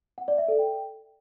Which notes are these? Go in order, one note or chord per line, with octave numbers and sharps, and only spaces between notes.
F#5
D5
E5
A4
G5